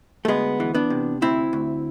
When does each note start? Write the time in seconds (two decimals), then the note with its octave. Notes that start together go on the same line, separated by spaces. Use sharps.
0.25 A3
0.28 D2 G#3 B3
0.60 E3
0.75 B3 D4
0.90 C3
1.22 D2 C4 E4
1.53 D2